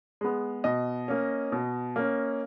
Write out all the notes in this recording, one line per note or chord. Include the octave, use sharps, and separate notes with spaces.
G#3 B3
B2 D#5
A#3 C#4
B2
A#3 C#4